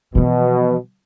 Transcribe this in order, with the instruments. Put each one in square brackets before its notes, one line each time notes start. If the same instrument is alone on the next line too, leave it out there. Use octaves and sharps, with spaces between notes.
[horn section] B2 [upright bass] E3 F3